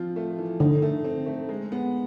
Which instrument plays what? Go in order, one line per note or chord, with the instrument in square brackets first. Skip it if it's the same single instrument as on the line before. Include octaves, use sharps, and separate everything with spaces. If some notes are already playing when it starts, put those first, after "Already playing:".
Already playing: [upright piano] F3 C4 F4
A3
E3
[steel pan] D3 [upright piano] D#4
[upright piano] A3
C4
A3
G#3
B3